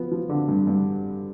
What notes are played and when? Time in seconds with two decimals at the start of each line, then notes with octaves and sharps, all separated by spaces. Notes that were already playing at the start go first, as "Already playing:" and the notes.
Already playing: F3 B3
0.11 F3
0.29 D3
0.48 G2
0.67 G2